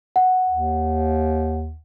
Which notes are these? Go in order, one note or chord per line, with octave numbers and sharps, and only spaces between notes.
F#5
D#2